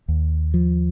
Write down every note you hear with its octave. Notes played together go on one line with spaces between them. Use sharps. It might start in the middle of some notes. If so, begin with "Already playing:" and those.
D#2
F3